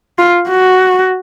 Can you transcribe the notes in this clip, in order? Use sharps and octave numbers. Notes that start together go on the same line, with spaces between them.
F4
F#4